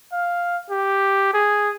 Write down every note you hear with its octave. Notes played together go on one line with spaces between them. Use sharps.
F5
G4
G#4